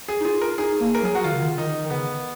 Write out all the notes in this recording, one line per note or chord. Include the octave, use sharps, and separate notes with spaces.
G#4
D#4
F4 G#4
A#4
D#4 G#4
A#3
A#4
F#3
G#4
F#4
D#3 F4
C#3
D#3
D#3 D#4
D#3
C#3 B3